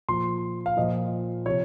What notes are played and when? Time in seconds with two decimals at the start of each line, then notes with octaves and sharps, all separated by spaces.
0.08 A#2 F3 C6
0.66 F5
0.77 A#2 F3 D#5
1.46 C3 F3 C#5